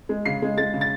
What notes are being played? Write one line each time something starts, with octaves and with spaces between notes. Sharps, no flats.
G#3
C#3 C7
G#3
G#3 A6
C#3
A6